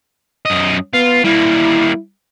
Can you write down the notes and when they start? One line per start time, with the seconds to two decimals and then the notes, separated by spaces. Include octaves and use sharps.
0.45 F#2 D#5
0.93 B3 F4
1.24 G3 A#3 E4